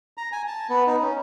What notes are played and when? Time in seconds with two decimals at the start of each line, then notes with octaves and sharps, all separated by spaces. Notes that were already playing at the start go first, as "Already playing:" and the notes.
0.18 A#5
0.32 G#5
0.47 A5
0.69 B3
0.87 D#4
1.02 C#4